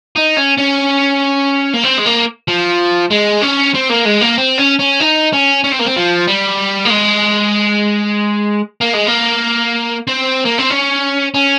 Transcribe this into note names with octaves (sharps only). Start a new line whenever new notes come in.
D#4
C#4
C#4
A#3
C4
G#3
A#3
F3
G#3
C#4
C4
A#3
G#3
A#3
C4
C#4
C#4
D#4
C#4
C#4
C4
A#3
C4
F3
G3
A#3
G#3
A#3
G#3
A#3
C4
A#3
C4
C#4
C#4